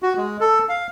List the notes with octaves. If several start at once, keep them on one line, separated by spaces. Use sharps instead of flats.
F#4
G#3
A4
F5